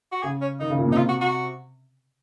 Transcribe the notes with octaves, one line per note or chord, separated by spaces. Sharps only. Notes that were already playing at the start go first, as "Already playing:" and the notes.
F#4
C#3 G#4
C#4
D#3 D#4
C#3
A#2
C3 D#4
F4
F#4
F#4